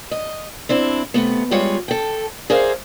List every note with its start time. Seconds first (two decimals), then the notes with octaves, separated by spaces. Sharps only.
0.11 D#5
0.69 C4 D4 E4
1.14 C3 A3 B3
1.51 G3 G#3 F4 B4 C#5
1.88 A4 G5
2.50 G#4 A#4 C5 D5 E5 F5